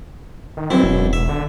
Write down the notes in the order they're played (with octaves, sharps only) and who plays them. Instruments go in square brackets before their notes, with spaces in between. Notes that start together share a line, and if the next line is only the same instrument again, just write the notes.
[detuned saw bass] D#3
[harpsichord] B1 F#2 E4 [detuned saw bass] C4
[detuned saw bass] E1
[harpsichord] E5
[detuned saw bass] D3